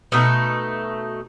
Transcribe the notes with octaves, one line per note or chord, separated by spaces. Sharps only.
B2 A3 D#4